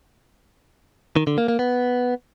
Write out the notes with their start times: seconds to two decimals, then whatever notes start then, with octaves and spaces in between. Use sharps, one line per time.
1.16 D#3
1.27 D3
1.38 A#3
1.48 A#3
1.59 B3